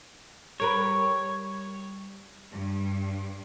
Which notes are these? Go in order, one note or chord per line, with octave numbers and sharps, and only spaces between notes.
G3 A#4 B4 C#5
G2